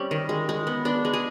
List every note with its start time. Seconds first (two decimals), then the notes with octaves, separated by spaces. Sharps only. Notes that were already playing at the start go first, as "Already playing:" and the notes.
Already playing: G3 C4 C#4
0.11 D#3
0.29 G#3
0.49 G#3
0.67 B3
0.85 B3 D4
1.05 G#3
1.13 G#4